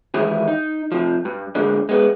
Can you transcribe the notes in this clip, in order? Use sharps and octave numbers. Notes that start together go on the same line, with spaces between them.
D#3 E3 G#3 E4 G4 G#4
D#4
C3 F3
G2
A#2 D3 G3 G#3 A#3 D4
G#3 B3